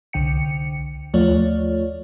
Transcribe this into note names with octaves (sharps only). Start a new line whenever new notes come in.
C2 D3 G5 C#7
D#2 F3 A3 F4 C#5 D5